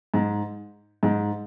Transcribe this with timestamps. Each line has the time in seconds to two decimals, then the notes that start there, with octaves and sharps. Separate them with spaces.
0.14 G#2
1.03 G#2